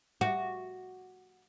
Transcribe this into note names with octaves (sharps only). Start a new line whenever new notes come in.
F#4